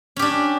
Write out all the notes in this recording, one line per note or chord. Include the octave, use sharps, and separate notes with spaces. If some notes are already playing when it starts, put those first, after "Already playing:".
C#4 D4 G4